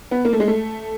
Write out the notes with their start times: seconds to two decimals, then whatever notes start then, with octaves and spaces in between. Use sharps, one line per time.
0.11 B3
0.25 A#3
0.33 A3
0.40 G#3
0.48 A3